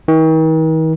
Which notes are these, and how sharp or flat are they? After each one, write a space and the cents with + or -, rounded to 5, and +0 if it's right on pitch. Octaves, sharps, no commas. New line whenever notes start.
D#3 +45